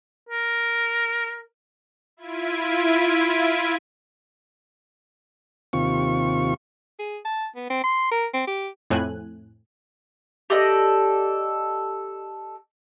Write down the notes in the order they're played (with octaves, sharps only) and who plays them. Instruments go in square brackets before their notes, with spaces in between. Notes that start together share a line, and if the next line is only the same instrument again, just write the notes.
[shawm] A#4
[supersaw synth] E4 F4 G#6 B6 D7 D#7
[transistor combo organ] D#2 C3 F4 C#6
[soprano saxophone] G#4
A5
B3
C4
C6
A#4
C4
G4
[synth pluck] F2 A2 C4 G#5 F#6
[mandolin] G4 A4 D5 D#5